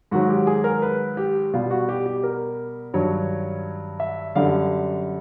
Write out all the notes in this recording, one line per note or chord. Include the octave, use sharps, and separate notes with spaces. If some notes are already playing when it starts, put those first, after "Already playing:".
G#2 D#3 F#3 F#4
G4
G#4
A#4
B4
G4
B2 G3 F4
F#4
G4
G4
A#4
G2 D#3 F#3 C#5
E5
F#2 D3 G3 F5